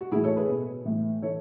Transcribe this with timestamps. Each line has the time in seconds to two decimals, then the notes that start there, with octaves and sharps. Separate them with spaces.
0.01 F#4
0.12 A2 E4 G#4
0.15 E3
0.24 A4 C#5
0.36 G#4 B4
0.49 B2
0.85 A2 E3
1.22 E3 A4 C#5